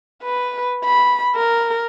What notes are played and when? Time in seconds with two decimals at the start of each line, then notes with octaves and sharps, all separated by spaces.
0.23 B4
0.85 B5
1.35 A#4